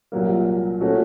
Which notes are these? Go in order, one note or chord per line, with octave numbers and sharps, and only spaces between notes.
C2 A#2 F#3 A#3
A#2 A3 C#4 F#4